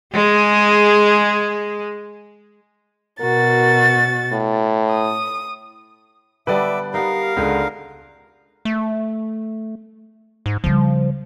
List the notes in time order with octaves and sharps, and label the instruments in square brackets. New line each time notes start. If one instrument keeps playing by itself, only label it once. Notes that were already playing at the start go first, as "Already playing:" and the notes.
[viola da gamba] G#3 G#4
[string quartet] B2 F#4 A6 [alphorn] A#4
[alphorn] A2
[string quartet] D#6
[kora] D3 G3 B3 [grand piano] B4 D5 [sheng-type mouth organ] E5 D6
[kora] B3 D#4 [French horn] G4 [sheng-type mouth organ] A#4 F5
[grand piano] C#2 [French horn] D3 [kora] D#4 B4 F#5
[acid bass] A3
G#2
[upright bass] C#3 G3 [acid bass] F3